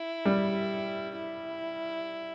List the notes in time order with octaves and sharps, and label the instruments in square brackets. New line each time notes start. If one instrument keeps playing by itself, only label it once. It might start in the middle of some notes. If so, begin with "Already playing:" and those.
Already playing: [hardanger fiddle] E4
[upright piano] G3
[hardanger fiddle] E4